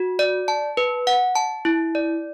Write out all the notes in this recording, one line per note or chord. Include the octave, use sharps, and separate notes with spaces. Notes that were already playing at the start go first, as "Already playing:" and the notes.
Already playing: F#4
D5
A5
B4
F#5
A5
E4
D5